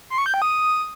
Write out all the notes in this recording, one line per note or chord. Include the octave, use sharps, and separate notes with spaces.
C6
C#6
G6
G5
D#6